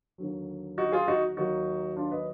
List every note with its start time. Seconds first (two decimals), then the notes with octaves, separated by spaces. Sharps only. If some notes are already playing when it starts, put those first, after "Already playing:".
0.18 D#2 D3 F#3
0.78 D#4 F#4
0.92 F4 G#4
1.08 D#4 F#4
1.37 D#2 D#3 F#3 D#4 F#4
1.97 D4 F4
2.11 B4 D#5